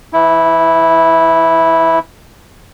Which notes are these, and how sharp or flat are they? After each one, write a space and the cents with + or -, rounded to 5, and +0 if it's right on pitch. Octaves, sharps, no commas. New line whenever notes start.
E3 +25 E4 -10